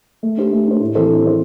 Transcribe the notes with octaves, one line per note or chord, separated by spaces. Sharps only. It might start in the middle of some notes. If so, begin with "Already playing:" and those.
A3
D4 G4 C5
A3
D4 G4 C5
A2
E3 C4 A4 C5
A2
E3 C4 A4 C5